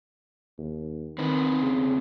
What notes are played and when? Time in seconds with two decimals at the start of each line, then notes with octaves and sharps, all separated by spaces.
0.58 D#2
1.18 E2 D#3 C4 B4
1.61 C#3